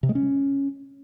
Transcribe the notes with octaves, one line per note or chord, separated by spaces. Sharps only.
C3
G#3
C#4